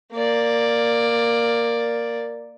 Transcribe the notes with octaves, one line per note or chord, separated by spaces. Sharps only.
A#3 D5